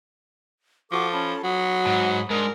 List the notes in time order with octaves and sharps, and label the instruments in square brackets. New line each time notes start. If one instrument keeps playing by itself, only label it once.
[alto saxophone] F3 [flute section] F#4 C#6 D6 [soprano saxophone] A4
[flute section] C#4 A5 B5
[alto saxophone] F#3 [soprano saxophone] F#4 [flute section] B5 D#6
[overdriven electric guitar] G#2
[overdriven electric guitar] G#2 [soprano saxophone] D4 [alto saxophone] A#4 [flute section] D#6